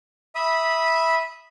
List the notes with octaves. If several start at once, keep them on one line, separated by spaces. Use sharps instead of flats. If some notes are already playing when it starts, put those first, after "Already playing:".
E5 B5 D#6